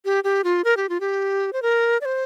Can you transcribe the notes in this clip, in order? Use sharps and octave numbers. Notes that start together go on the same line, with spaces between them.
G4
G4
F4
A#4
G4
F4
G4
C5
A#4
D5
C5